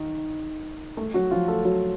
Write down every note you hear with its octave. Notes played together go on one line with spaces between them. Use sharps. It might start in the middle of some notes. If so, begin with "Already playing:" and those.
Already playing: D#3 D#4
A3 A4
F#3 F#4
F3 F4
A3 A4
F#3 F#4